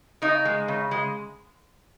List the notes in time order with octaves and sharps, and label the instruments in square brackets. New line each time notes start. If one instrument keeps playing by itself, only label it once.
[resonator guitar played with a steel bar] C#3 D#4
G#3
C#3
G#3